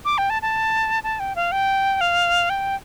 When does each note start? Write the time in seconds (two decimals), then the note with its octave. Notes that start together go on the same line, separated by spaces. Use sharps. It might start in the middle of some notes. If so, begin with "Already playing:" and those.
0.05 D6
0.18 G5
0.30 A5
0.42 A5
1.04 A5
1.20 G5
1.36 F5
1.52 G5
2.01 F5
2.50 G5